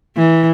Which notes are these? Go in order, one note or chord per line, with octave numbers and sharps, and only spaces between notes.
E3